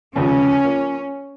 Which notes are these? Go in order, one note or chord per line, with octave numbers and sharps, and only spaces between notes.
F1 D#2 C#3 F3 G#3 C#4
F3 A#3